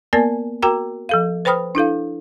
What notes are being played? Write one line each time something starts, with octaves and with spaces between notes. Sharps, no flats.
A#3 B3 A#4 D5 G#5 A5
F#4 A#4 G5 A#5 D6
F3 A4 F5
B4 C5 G5 B5 D#6 F6
D4 E4 A4 F5